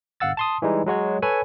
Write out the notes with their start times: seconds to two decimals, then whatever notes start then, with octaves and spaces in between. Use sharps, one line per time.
0.20 G1 F5 F#5 E6 A6
0.37 A5 C6 D#6
0.62 E3 G3 G#3 D#4
0.86 F#3 G#3 F#4 C#5
1.22 A4 B4 C#5 G#5 B5